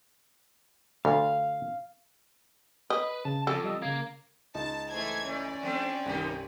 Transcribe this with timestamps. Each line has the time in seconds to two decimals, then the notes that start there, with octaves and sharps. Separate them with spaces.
1.05 D2 F5
2.90 B4 D#5
3.25 C#3 A5
3.47 F2 A4
3.64 G3 D#5 E6
3.82 C#3 A#3 G#6
4.55 C#2 D#4 A5
4.91 E3 A3 C5 G#6
5.26 A3 C#4 D5
5.63 F3 A3 C4 D4
6.06 C2 G2 D#3 G3 D#4 B6